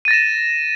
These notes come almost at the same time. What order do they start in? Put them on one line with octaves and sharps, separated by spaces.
D#7 A6 A#6 E7